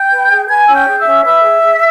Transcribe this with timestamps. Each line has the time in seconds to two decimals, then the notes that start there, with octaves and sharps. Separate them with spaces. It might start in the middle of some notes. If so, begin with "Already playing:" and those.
Already playing: G5 G6
0.11 B4
0.30 G#4
0.48 B4 G#5 G#6
0.67 C#4 E6
0.74 G5 G6
0.87 G#4
1.00 E5 E6
1.06 C#4
1.25 B4 E5 E6
1.43 G#4
1.62 G#4